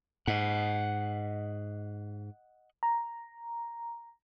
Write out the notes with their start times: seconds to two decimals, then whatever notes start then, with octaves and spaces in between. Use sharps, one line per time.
0.27 G#2 D#5 F#5
2.83 A#5